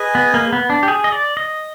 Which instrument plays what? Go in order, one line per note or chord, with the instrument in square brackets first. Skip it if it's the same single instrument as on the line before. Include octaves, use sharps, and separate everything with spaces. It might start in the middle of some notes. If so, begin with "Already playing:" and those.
Already playing: [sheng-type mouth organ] G#4 B4 D#5 G#5
[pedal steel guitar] B3
A#3
B3
D4
G4
G#4
D#5
D5
D#5